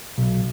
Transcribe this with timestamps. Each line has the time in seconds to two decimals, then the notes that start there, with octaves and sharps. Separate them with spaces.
0.18 B1